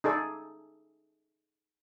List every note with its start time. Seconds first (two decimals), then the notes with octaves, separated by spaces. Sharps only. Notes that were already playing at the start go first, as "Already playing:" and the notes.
0.04 D#4 G#4 A4 D5